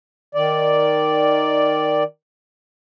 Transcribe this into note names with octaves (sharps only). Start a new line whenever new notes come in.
D#3 D5